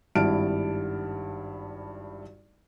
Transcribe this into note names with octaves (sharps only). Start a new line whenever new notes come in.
G#1 G2 E4 A5 F6 D7